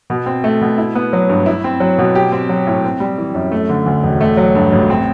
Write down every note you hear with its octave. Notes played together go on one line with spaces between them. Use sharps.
B2
C4
A3
B2
E4
B3
F#3
G2
E4
C4
F#3
B2
G4
C4
F#3
A2
C4
G3
E3
F#2
A3
D3
D2
E1
A3
F#3
G2
A1
C4